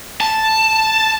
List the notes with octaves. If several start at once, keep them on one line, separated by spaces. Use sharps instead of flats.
A5